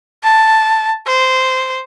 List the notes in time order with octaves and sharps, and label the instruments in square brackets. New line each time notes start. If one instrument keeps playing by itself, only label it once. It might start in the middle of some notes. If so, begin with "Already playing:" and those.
[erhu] A5
C5